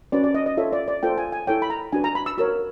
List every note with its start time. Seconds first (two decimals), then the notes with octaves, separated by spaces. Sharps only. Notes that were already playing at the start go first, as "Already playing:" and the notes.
0.12 C#4 F#4 B4 D5
0.24 D5
0.34 D#5
0.46 D#5
0.57 F4 A4 C#5 E5
0.73 D5
0.88 D5
1.03 F4 A4 C5 G5
1.18 G#5
1.32 G#5
1.47 E4 A4 C#5 G5
1.62 B5
1.70 A#5
1.93 D4 F#4 B4 G#5
2.04 A#5
2.15 B5
2.26 E6
2.38 F#4 A#4 C#5 E6